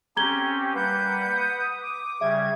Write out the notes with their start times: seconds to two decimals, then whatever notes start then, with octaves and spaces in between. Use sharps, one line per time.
0.17 C4 C#4 G4 A#5 G#6 G7
0.74 G3 A#3 B4 F#5 G6
1.36 D#6
1.80 D6
2.21 C#3 G3 E5 G#6